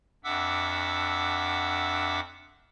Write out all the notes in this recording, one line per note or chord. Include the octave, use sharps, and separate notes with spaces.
F2 D4 E5 F#5 D6 E6